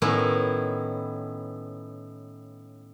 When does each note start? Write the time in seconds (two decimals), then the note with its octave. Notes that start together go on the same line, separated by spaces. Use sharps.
0.02 A2 D#3 B3 C#4 E4